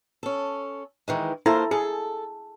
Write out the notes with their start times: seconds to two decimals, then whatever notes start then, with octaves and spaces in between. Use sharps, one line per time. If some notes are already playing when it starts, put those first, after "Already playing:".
0.23 C#4 A4
1.08 D#3 E3 G#3
1.46 A#3 E4 F4 A4 C5 A#5
1.71 G#4 A4